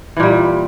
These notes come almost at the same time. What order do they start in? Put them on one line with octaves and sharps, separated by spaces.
E3 A#2 G3